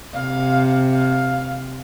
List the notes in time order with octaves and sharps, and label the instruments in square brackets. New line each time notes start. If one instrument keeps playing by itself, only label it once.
[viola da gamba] C3 [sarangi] F5
[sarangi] F5